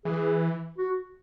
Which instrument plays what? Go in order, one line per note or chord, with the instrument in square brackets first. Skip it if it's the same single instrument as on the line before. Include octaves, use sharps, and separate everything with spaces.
[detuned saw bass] E3 [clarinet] G#4
[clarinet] F#4